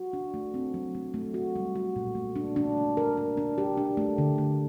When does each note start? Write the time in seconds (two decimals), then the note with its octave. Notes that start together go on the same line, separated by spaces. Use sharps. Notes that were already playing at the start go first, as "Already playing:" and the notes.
Already playing: F#4
0.13 D4
0.34 A3
0.54 C4
0.74 F#3
0.95 A3
1.14 A3
1.34 F#4
1.55 G3
1.75 F#4
1.96 A#2
2.15 A3
2.36 D4
2.56 D4
2.77 A3
2.97 A#4
3.17 D4
3.37 D4
3.58 G4
3.77 D4
3.97 A3
4.18 D3
4.38 A3